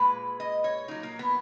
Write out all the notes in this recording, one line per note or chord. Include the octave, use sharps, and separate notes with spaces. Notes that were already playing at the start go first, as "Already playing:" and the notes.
Already playing: A#2 G#3 B4
D#5
C#5
A#2 F#3 D#4
A#3
B3